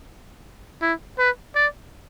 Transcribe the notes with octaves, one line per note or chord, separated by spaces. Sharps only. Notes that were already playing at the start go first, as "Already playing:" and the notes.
E4
B4
D5